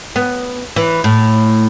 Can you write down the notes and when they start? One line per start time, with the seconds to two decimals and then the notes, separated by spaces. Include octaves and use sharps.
0.16 B3
0.76 E3
1.04 A2